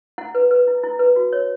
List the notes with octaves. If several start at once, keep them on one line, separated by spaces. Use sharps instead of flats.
E4 F#5
B4
B4
E4
E4
B4
F#4
C#5